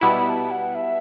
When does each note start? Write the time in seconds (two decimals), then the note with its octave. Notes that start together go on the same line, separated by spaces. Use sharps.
0.01 B2 G3 B3 E4 B5
0.26 B5
0.29 A5
0.51 F#5
0.75 E5